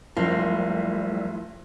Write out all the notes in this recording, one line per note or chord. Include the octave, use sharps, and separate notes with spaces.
F#1 F3 G3 A3 E4